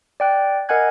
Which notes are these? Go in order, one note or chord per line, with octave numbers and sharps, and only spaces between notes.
D5 G5 F#6
A#4 D#5 F#5 G#5 F#6 G#6